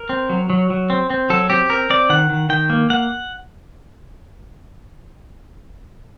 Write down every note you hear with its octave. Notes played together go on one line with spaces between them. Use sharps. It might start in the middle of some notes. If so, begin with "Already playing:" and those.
Already playing: A#4
C4
F#3
F#3
F#3
C4
C4
F#3 A4
C4 G4
C4 A#4
C4 D5
D#3 F#5
D#3
D#3 G5
A#3
A#3 F#5